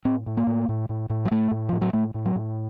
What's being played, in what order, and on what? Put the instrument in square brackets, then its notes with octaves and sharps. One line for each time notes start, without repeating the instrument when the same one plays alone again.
[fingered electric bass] A2 C4
A2
A#3
A2
A2
A2
A2
F#3
A2 A3
A2
A2 F3
F#3
A2 A3
A2
F#3
A2